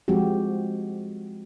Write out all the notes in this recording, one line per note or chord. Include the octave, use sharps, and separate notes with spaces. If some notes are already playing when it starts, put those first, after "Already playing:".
F3 G#3 C4 F#4 G4